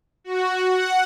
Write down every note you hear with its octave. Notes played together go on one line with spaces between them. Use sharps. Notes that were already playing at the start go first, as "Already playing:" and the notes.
F#4
F#5